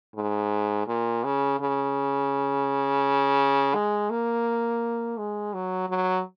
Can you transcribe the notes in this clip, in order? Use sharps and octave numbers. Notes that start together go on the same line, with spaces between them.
G#2
A#2
C#3
C#3
G#3
A#3
G#3
F#3
F#3